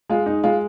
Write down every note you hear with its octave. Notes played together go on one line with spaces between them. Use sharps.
G#3 F4
D#4
G#3 F4